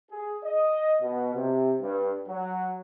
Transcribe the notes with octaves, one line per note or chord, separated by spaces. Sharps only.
G#4
D#5
B2
C3
G2
F#3